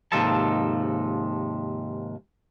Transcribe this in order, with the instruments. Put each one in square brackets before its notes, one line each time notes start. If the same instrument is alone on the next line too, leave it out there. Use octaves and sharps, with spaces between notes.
[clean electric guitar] D#2 G#2 C3 F3 A4 A5